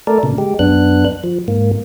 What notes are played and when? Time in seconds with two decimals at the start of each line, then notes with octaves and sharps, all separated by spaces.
0.07 A3 A4 A#4 D5
0.23 A#2 C#3
0.38 G#3 G4
0.59 F#2 B3 D4 F#6
1.24 F3
1.48 G#2 A#3